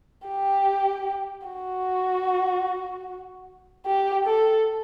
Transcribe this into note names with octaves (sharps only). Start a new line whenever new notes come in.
G4
F#4
G4
A4